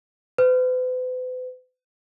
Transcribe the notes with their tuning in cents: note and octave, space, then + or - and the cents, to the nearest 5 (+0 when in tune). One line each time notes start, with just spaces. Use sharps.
B4 +45